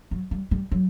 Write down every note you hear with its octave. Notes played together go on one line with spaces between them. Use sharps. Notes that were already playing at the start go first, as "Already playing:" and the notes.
F#3
G3
G3
F#3